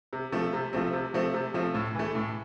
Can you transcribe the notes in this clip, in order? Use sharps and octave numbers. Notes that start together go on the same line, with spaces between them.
C3
F3 A3 C4
C3
F3 A3 C4
C3
F3 A3 C4
C3
F3 A3 C4
A2
E3 A3
A2